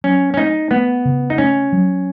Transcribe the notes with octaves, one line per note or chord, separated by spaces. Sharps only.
F#3 C#4
C#4
A3 D#4
A3 B3
C#3
D#4
A3 C#4
F#3